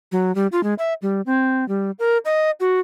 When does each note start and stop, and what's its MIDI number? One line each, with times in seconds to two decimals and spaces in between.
0.12 0.34 54
0.35 0.47 55
0.52 0.63 65
0.63 0.74 56
0.79 0.94 76
1.02 1.21 55
1.26 1.67 60
1.68 1.91 55
1.99 2.18 70
2.25 2.51 75
2.60 2.80 66